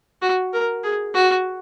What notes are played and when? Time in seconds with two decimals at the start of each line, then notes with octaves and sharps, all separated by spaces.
0.22 F#4
0.53 A#4
0.84 G#4
1.14 F#4